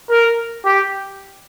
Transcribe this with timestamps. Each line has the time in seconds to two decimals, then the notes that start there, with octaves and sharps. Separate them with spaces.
0.10 A#4
0.65 G4